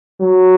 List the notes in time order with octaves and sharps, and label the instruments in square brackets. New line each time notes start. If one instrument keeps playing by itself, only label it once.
[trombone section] F#3